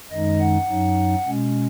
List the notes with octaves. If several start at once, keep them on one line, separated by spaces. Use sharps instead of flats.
F#2 D#3 G#3 D#4 D#5
F#5
F#2 F#3 D#4
B2 G#3 C#4